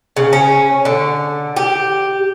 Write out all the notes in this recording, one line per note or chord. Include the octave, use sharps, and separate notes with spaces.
C#3
C#4
D3
G4